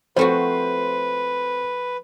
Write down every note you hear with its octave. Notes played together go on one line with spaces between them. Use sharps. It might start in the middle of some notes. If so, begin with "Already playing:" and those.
F3 A3 C4 F#4 B4 C5